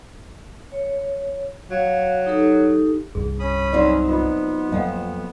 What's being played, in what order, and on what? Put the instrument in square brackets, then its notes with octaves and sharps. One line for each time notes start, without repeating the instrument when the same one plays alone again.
[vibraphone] C#5
[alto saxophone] F#3 [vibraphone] F5
[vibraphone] D#4 G4 A4
[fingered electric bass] C2 G2 [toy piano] G#4
[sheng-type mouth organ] C#4 B5 D#6
[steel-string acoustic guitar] F#3 C4 D#4 [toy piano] D5
[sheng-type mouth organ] B3 [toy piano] F4 D#5
[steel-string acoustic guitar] F2 [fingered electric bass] F3 F#3 A#3 [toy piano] D#5 F5 F#5